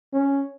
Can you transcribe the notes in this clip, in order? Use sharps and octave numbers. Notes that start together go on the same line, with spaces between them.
C#4